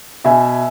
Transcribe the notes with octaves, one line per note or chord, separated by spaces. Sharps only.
B2 E5 G#5